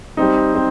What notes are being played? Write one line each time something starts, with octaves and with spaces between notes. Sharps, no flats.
G3 C4 D#4
G3 C4